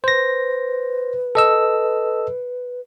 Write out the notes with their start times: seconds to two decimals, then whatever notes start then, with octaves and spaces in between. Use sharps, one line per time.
0.04 B4 C5 A#6
1.35 A4 D#5 E6